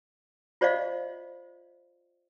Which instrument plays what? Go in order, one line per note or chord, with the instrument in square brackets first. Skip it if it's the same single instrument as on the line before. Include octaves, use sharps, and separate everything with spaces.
[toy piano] F4 C5 D5 D#5 F5